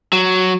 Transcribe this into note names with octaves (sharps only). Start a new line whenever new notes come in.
F#3